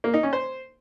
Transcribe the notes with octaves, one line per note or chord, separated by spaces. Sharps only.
A#3
D#4
C#4
C5